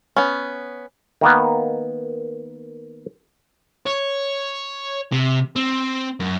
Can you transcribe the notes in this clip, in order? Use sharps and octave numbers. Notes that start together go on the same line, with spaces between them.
B3 C#4
D#3 A#3 B3
C#5
C3
C4
F#2